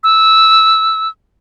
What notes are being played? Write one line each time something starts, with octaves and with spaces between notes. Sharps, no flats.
E6